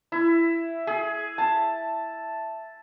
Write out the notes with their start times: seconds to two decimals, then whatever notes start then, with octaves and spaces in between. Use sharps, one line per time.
0.12 E4
0.87 G#4
1.38 A5